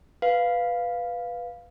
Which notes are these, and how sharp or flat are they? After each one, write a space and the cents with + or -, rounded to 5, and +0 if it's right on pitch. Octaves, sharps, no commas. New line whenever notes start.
B4 +0 F5 +0